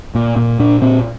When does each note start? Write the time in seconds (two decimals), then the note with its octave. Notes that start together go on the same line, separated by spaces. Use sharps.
0.15 A#2
0.36 A#2
0.60 A#2 D4
0.82 A#2 C4